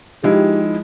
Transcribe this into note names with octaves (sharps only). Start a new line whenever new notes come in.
F3 G#3 D#4 E4 G4